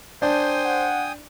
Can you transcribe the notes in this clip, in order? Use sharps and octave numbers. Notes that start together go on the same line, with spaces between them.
D4 C5 G5 G#5 D#6
F#5